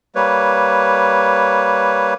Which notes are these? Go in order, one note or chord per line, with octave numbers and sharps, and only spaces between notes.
G3 A#3 B4 C#5